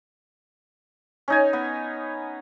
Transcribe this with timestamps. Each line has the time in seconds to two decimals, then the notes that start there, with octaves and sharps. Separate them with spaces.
1.28 C#4 D#4 G#5
1.53 B3